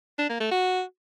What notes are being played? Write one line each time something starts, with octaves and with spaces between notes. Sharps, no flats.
D4
A#3
A3
F#4